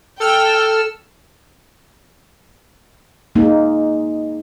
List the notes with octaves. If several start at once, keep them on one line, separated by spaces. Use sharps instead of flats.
A4 G5 E6 F6
G#3 A#3 D#4